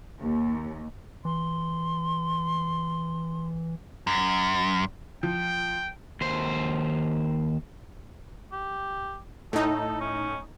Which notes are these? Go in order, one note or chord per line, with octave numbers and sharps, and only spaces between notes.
D#2
E3 C6
F#2
F3 G5
D#2 C5
G4
A2 D#4 A4
C#4